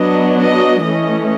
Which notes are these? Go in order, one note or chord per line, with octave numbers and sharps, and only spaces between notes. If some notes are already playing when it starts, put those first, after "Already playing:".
Already playing: F#3 B3 D4 D#5
D#5
E3 A3 C#4 D#5